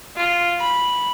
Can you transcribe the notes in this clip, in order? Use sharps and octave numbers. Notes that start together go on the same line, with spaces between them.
F4
B5